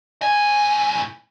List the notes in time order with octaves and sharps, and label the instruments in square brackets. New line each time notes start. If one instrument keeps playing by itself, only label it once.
[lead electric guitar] A2 G#5